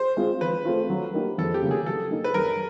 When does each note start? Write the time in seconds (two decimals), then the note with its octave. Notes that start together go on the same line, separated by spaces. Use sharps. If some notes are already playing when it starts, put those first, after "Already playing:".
Already playing: C5
0.17 G#3 C4 F4
0.41 F3 B4
0.65 A3 C4 F4
0.90 F#3
1.14 A#3 D#4 G4 A#4
1.38 F2 A4
1.54 G4
1.62 C#3 F#3 A#3
1.71 G#4
1.86 F#3 A4
2.11 A#3 D#4
2.24 B4
2.34 F#2 A#4